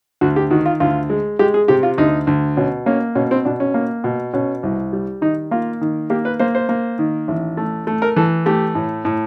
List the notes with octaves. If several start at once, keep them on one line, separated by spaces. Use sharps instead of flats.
D2 F#4
G4
D#3 F#4
F4
D2 F4
G#3
G#3 G4
G#4
C3 G4
F4
D2 D#4
D2
B2 C#4
A#3 C#4
B2 C#4
C4
B2 D4
C#4
A#3
B2
B2 C#4
C2
G3
D#3 D#4
A#3 F4
D#3
A#3 G4
B4
A#3 C5
C5
A#3
D#3
A1
A3
A3
A#4
E3 A4
A3 G4
A2
A2